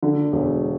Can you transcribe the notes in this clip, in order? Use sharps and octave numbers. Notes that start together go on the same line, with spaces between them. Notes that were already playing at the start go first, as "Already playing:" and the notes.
D3
E1